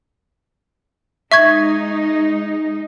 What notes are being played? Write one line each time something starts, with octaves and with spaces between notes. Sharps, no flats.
G#3 D#4 E5 C#6 G#6